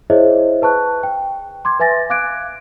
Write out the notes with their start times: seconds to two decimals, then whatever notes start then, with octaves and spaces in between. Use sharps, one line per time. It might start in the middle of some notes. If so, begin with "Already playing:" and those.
0.10 E4 G#4 C5 C#5 D#5 E5
0.62 B4 A5 C#6 F#6
1.03 G5
1.65 C6 D6 G#6
1.80 B4 E5 G#5 A6 A#6
2.10 F5 D6 F#6 G#6 D7